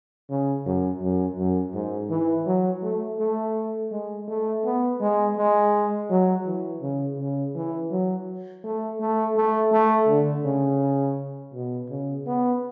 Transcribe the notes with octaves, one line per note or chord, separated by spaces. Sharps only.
C#3
F#2
F#2
F#2
G#2
E3
F#3
A3
A3
G#3
A3
B3
G#3
G#3
F#3
E3
C#3
C#3
E3
F#3
A3
A3
A3
A3
D3
C#3
B2
C#3
B3